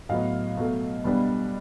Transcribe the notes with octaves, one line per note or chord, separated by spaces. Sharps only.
A2 F#3 B3 D#5 F5
B2 F#3 A3
B2 G3 B3 D4